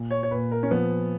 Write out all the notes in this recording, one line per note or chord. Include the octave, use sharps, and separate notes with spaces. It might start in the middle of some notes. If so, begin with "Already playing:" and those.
Already playing: A#2
C#5
C#5
A#2 B4
A#4
C#4
F3 B3